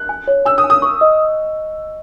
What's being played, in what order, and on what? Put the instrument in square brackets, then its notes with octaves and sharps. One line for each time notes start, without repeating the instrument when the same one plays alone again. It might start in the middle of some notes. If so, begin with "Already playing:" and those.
Already playing: [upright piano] F#6
[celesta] G#5
C#5
[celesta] G#5 [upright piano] E6
[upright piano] D#6
[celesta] G#5
[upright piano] D#6
[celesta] C#6
D#5